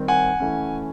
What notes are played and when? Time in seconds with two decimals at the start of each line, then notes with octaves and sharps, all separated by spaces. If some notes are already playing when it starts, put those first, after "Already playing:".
Already playing: D#3 G3 C4
0.08 F#5 G#5
0.40 E3 A3 C#4